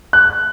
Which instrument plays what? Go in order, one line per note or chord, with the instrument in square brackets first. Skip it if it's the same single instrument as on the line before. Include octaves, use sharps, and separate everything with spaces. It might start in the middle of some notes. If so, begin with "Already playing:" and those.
[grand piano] F#6